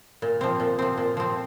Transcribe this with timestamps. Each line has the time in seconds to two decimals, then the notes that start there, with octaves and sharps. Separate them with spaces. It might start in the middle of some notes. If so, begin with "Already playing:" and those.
0.22 A#2
0.41 F3 C4
0.60 A#2
0.79 F3 C4
0.98 A#2
1.17 F3 C4